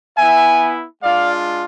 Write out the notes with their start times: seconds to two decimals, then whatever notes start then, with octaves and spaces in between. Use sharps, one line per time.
0.18 B3 E4 E5 G#5
1.02 G#3 D4 F4 D5 F5